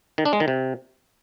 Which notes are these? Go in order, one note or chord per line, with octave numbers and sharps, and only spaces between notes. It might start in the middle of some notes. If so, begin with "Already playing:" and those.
D#3
D4
G#3
D#3
C3